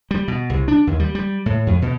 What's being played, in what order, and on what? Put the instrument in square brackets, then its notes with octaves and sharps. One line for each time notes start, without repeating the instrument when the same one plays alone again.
[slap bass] G3
B2
C2
D4
D#2
G3
G3
A2
F2
B2